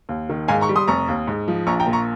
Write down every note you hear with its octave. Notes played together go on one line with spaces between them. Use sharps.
D#2
D#3
G#2 F5 G#5
A#5 C#6
G3
C6 D#6
F1 A#5 C#6
D#2
G#2
F3
A#1 A#5 C#6
G5 A#5
A#2
A#5 C#6